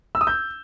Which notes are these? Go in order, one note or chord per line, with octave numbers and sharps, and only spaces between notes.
E6
D#6
G6